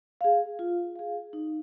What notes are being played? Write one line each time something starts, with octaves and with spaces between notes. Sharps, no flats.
G#4 F5
F4
G#4 F5
D#4